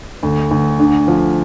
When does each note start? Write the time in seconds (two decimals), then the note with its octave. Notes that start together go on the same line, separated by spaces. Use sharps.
0.23 D2
0.51 D2
0.80 D3
1.08 F3